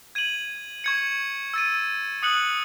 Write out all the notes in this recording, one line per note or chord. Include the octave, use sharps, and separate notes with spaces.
G#6 D#7 F#7
C#6 G#6 C#7
E6 A6 D#7
D#6 F#6 C#7 F#7